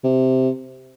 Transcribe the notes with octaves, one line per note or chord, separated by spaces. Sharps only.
C3